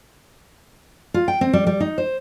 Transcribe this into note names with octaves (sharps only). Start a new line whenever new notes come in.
F4
G5
C4
G3
G3
D#4
C5